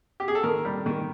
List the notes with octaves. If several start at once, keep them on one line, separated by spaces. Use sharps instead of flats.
G4
G#4
A4
D#3 A#4
G3
D#3